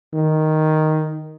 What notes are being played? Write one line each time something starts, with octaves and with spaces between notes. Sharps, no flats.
D#3